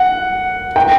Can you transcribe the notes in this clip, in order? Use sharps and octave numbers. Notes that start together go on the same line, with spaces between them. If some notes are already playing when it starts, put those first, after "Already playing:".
Already playing: F#5
G5